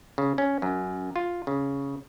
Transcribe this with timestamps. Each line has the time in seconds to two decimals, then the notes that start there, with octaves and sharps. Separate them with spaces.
0.18 C#3
0.38 C#4
0.62 F#2
1.16 F4
1.47 C#3